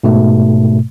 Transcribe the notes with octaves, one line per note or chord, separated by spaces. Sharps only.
G#2 B2 A3